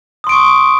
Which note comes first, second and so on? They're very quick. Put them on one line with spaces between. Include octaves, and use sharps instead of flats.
D#6 C6 D7 C#6